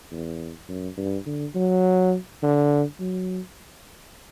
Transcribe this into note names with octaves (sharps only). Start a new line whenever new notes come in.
E2
F#2
G2
D3
F#3
D3
F#3